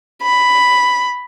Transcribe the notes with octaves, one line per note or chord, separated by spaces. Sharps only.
B5